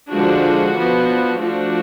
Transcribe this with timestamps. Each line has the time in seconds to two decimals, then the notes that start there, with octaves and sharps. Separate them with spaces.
0.10 D3 F3 G#3 D4 F#4
0.75 F3 B3 D4
1.39 F3 A3 D4 F#4